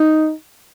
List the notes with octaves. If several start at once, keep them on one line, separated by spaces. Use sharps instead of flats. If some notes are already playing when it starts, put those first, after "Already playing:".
Already playing: D#4